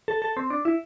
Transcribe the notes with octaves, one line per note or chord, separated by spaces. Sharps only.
A4
A4
C4
D4
E4